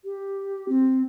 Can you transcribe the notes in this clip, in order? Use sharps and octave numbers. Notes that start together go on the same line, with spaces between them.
G4
C4